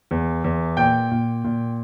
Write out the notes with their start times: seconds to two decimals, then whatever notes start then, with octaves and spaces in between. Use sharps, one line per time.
0.11 E2
0.44 E2
0.77 A#2 G5 G6
1.11 A#2
1.44 A#2